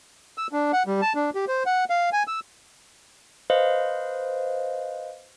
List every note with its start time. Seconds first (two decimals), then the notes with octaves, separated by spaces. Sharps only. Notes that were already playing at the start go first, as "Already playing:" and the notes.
0.38 E6
0.53 D4
0.73 F#5
0.87 G3
1.02 A5
1.15 D4
1.35 G4
1.48 C5
1.66 F#5
1.90 F5
2.13 G#5
2.27 E6
3.50 B4 C5 D#5 F5